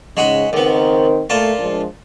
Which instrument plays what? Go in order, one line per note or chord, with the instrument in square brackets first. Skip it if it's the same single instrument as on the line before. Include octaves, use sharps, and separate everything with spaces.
[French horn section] G#2 C#3 [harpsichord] G#3 F#4 B5
[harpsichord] C#2 B3 [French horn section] D#3 C4 A#4
[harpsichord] A#2 F4 A5 [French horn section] A3
[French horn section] F3 G#3 D4